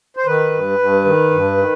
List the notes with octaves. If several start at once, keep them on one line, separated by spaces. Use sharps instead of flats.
C5
D#3 B4
G2
G2
D#3
G2
D#3